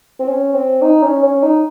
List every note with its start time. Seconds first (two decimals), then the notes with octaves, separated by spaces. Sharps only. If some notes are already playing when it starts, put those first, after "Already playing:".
0.19 C4
0.27 C#4
0.54 C4
0.82 D#4
1.02 C#4
1.23 C#4
1.42 D#4